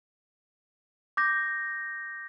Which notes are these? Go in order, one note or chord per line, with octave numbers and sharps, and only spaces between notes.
D6 G6 A#6